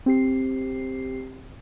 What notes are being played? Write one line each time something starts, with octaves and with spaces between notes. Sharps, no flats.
C4 G4 C7